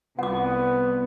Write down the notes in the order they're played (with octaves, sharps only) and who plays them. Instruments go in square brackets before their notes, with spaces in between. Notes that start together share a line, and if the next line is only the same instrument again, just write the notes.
[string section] C2 [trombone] B3 [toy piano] F#5 D6